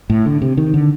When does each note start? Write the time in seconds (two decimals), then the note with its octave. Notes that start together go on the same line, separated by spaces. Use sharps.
0.10 A2
0.26 D3
0.42 C3
0.57 D#3
0.74 D3